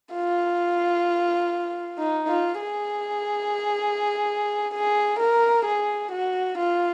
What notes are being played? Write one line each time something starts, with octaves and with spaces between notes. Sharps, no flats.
F4
D#4
F4
G#4
G#4
A#4
G#4
F#4
F4